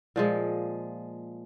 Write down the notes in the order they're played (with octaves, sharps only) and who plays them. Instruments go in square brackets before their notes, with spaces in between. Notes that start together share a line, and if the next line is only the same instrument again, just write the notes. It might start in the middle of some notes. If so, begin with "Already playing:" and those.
[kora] A#2 F3 G#3